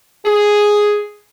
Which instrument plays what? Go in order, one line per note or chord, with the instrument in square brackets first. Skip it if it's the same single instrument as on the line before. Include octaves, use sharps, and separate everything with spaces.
[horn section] G#4